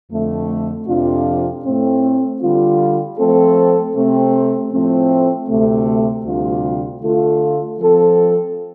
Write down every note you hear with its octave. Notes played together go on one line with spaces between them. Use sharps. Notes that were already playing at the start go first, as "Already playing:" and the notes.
F2 D3 A3
F2 C3 F3 D4 F4
A2 A3 C4
D3 G3 F4
F3 A3 C4 A4
C3 A3 C4
A2 F3 A3 C4
D2 C3 A3
D2 C3 G3 D4 F4
D3 A3 F4 A4
F3 C4 A4